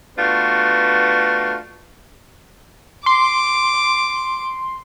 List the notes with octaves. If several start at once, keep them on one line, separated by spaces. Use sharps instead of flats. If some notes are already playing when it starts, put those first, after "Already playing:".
A3 B3 D4 F4 F#4 B4
C6 D6